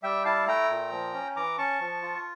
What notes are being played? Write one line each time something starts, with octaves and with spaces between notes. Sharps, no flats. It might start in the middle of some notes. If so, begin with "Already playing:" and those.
G3 E5 G5
E4 F5 A5
A3 G5 A#5
A#2
F3
C#4
E3 A#5 D6
C#4 A5 C#6
F3
F4